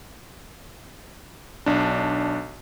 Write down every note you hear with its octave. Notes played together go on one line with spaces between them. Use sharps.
B1 D4